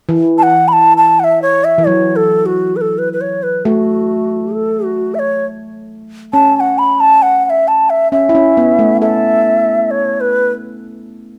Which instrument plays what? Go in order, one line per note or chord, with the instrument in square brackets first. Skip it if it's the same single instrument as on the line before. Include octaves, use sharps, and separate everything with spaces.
[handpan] E3
[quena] A5
F#5
B5
A5
A5
F#5
E5
C#5
E5
[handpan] E3
[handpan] F#3 [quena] C#5
[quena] A4
F#4
B4
A4
B4
B4
C#5
B4
[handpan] A3 [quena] F#4
[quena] A4
F#4
E5
C#5
[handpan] C#4 [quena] A5
[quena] A5
F#5
B5
A5
F#5
F#5
E5
A5
E5
[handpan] C#4 [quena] E5
[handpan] E4
C#4
B3
A3
[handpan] A4 [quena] E5
[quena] C#5
B4